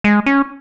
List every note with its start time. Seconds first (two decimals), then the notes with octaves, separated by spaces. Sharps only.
0.04 G#3
0.26 C#4